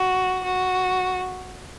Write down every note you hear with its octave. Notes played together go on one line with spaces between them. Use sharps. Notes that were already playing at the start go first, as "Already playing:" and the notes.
Already playing: F#4
F#4